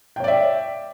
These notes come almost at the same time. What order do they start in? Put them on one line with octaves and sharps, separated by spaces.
G5 C#5 D5 E5